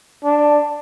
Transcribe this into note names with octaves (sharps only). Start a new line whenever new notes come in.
D4